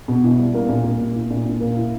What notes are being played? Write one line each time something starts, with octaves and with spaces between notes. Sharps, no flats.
B2
E4
G3
A#3
A#2
A#2
A#3
E4
A#2
A#2
A#3
E4